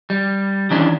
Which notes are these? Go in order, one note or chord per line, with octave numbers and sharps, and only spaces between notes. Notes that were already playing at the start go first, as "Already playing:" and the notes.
G3
D#3 E3 C#4 D4